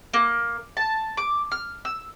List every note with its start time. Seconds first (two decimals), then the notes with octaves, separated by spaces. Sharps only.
0.14 A#3
0.77 A5
1.17 D6
1.52 F6
1.85 E6